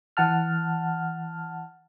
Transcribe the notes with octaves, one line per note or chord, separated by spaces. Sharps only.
E3 F#5 A5 F6